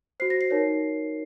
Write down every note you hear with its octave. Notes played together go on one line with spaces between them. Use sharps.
F#4 C5 C7
A#6
C7
D#4 A#4 C#5